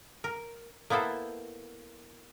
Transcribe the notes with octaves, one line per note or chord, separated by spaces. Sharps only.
A#4
A#3 B3 E4 A4 C5